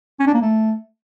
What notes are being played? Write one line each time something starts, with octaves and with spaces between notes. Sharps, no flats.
C#4
D4
A#3
A3